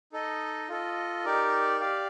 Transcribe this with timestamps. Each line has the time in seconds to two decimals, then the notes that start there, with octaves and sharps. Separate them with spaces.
0.12 D#4 A4 D#5
0.69 F4 A4 D#5
1.25 D#4 G4 A#4 D5
1.80 G4 D5 F5